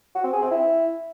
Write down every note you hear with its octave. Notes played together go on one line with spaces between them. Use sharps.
F#4
C4
G#4
C4
E4